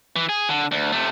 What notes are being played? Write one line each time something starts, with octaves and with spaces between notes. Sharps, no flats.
E3
G#4
D3
D2
C3 A3